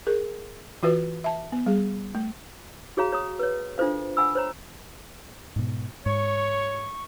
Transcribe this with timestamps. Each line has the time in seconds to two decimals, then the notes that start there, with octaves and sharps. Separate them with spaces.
0.07 G#4 A#4
0.83 E3 F4 F#4 B4
1.24 E5 A5
1.52 B3
1.66 G3 G#4
2.15 A3
2.97 F#4 G#4 C#5 F5 A#5
3.12 C#5 A#5 D#6
3.39 B4 C#5
3.78 D4 F4 A4 C5 F5
4.17 F#5 G#5 B5 E6
4.35 C5 C#5 A#5
5.56 G#2 B2
6.06 G#2 C#5 C#6